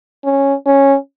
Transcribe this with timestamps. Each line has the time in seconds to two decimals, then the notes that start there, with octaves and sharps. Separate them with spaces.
0.24 C#4
0.66 C#4